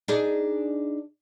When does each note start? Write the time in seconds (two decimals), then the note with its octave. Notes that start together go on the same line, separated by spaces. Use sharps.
0.08 D4 D#4 G#4